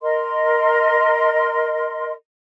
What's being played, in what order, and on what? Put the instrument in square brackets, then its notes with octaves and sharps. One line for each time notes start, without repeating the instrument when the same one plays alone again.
[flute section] A#4 D#5 C6